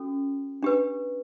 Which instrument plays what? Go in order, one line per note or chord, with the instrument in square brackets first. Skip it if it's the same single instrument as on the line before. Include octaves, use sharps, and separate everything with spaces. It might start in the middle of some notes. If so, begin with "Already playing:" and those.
Already playing: [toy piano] C#4 F#4 A4
D4 G4 B4